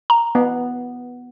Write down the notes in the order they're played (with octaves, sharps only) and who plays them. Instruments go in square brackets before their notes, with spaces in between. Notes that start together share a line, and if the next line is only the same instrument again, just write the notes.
[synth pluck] A#5
[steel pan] B3